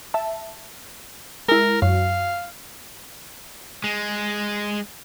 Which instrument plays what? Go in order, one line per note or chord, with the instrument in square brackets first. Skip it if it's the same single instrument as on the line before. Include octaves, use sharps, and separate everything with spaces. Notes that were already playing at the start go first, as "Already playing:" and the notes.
[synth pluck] E5 A5
[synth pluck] G#3 E4 [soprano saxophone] A#4
[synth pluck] F#2 [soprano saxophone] F5
[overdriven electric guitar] G#3